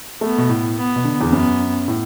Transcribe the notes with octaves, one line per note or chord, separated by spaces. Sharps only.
A3 B3
B2
A2
B3
B2
D3
E2
F#2 B3
A2